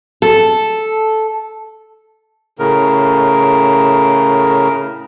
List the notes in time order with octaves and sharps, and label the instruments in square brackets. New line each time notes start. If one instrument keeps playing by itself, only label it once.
[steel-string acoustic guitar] A4
[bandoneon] A2 C#3 A#4